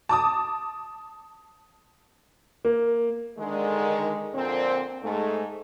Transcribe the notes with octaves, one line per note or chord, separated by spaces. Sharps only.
A5 D6 D#6
A#3
D3 D#3 G#3
F2 A#2 D3 C4
G#2 G#3 A3